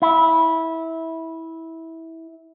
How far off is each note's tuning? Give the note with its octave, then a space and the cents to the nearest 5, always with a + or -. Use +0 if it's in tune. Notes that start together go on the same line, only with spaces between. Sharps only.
E4 -15